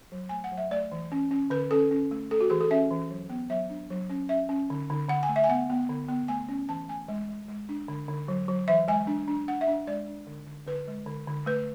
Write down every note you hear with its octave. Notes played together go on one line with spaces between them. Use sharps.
F#3
A3 G#5
F#5
F#3
E5
A3 D5
E3
C#4
C#4
D3 B4
C#4 A4
C#4
A3
A3 A4
F#4
E3 G#4
A4
C#4 E5
E3
F#3
B3
F#3 E5
D4
F#3
C#4
C#4 E5
C#4
D3
D3
D3 F#5
G#5
A3
E5
G#5
B3 F#5
B3
D3
B3
A3 G#5
C#4
E3 A5
A3 G#5
G#3
G#3
G#3
D4
D3
D3
F#3
F#3
E3 E5
G#3 G#5
D4
D4
D4 F#5
E5
D4
G#3 D5
D4
D3
D3
D3 B4
G#3
D3
D3
A3 B4